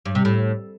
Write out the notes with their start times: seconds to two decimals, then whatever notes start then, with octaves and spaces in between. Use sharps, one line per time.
0.06 G2
0.15 C3
0.25 A2